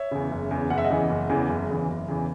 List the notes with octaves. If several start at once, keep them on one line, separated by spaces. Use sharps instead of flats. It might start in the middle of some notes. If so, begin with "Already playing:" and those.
Already playing: C#5 E5
E2 C#3
F#1
E2 C#3
F#1 F#5
E5
D#5 F#5
E2 C#3 E3
F#1
E2 C#3 E3
F#1
E2 C#3 E3
F#1
E2 C#3 E3